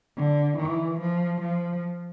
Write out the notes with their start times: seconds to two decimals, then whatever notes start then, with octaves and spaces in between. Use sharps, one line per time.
0.17 D3
0.58 E3
1.00 F3
1.41 F3